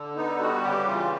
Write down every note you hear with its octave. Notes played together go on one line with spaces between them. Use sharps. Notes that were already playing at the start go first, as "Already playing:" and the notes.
Already playing: D3
B3 D#4
G3 F#4
C#3 G4
E3 F4